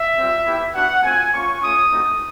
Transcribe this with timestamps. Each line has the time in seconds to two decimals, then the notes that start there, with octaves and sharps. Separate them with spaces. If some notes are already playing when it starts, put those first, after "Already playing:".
Already playing: E5
0.16 G3 C4 F4
0.44 B3 E4 G4
0.74 B3 D4 F#4 F#5
1.03 A3 C4 F4 G#5
1.32 A#3 C#4 F4 C#6
1.61 A3 C#4 F4 D#6
1.90 A3 C4 D#4 F#4